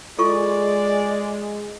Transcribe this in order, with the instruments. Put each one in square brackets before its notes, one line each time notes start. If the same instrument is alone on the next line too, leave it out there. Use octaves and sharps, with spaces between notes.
[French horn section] G#3 [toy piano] F4 A4 C#6 [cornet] D5